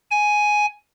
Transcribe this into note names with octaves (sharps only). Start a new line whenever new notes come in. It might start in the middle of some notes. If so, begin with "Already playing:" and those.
G#5